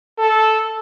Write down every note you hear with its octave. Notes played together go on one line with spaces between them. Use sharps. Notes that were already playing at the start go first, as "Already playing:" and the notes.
A4